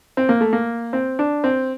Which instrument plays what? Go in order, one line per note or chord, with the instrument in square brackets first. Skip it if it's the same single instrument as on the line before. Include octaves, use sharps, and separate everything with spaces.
[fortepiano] C4
A#3
A3
A#3
C4
D4
C4